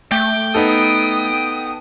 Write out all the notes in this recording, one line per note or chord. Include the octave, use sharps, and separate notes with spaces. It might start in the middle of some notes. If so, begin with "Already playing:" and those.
A3 G5 D6
B3 D#4 A4 D#6